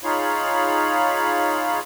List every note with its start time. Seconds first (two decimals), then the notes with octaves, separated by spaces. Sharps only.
0.04 D#4 F4 G#4 C#5 F5 B5